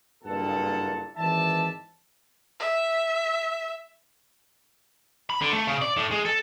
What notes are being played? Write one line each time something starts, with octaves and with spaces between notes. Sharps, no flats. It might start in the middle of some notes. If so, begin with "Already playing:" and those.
F#1 G2 A#2 A4 F#5 A5
G#1 E3 D5 E5 A5
E5
B5
D3
A3
C#3
D5
A2
G#3
A4